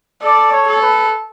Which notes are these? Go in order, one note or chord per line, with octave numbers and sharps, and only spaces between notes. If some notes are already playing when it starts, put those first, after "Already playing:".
A4 D5
C#5
A4
B4